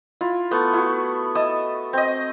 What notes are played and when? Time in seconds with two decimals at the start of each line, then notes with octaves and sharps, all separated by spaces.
0.21 E4 F4
0.51 A3 B3
0.73 E4 F#4
1.35 D#5 E5 A5 D#6
1.93 C4 D#5